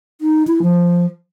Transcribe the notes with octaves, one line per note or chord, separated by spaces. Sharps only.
D#4
E4
F3